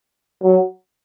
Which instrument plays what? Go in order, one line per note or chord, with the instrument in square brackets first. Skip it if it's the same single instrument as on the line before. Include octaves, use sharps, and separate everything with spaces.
[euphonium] F#3